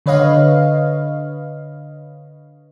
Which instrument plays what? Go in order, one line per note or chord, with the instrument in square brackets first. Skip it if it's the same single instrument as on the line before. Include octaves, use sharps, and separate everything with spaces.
[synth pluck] D3 B4 C#5 D#5 F5